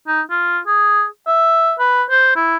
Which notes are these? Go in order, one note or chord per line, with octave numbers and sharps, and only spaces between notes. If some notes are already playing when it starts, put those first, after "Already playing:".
D#4
F4
G#4
E5
B4
C5
E4